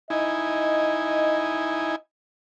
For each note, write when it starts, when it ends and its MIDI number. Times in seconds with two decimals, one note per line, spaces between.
0.10 1.96 63
0.10 1.96 64
0.10 1.97 75
0.10 1.96 80